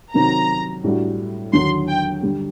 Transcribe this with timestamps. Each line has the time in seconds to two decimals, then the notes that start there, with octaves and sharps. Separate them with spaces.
0.14 C3 D#3 F#3 C4 D#4 A#5
0.84 A2 G3 D4 F#4
1.53 D#2 D3 F#3 C6
1.88 G5
2.23 G2 D3 G3